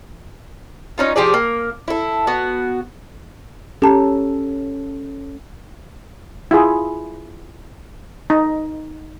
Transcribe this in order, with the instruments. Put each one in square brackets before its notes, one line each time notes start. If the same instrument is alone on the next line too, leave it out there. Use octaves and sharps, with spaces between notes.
[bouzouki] C#4 D#4 F4
F3 G4 G#4 D5
A#3
E4 A4
B3 F#4
[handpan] C#4 A4 [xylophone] G4 A5 A#5
[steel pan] E4 F4 G#4
D#4